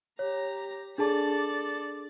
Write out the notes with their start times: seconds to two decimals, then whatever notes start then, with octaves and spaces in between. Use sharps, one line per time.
0.19 G4 C#5 A#5
0.98 D4 G#4 A4 D5 A5